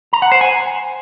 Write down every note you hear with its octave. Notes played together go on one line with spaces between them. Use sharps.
A#5
F#5
C5
G#5